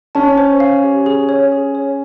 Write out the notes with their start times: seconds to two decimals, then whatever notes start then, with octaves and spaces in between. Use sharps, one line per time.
0.15 C#4 A5
0.38 C5
0.60 F5
0.84 G4
1.06 G#4
1.29 C#5
1.52 G#4
1.75 C#5